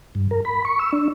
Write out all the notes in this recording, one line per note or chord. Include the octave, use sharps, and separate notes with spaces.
G2
A#4
B5
C#6
E6
D4